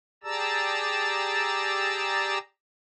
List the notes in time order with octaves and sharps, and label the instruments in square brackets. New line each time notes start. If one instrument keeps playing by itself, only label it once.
[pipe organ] G4 G#4 D5 A5 A#5 E6